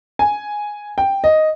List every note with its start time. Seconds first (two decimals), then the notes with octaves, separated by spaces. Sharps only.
0.19 G#5
0.98 G5
1.24 D#5